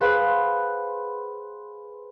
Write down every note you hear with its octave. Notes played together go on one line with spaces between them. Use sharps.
G#4 B4 C5 F5 F#5 B5